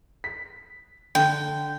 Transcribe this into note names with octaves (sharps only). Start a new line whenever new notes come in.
B6
D3 G5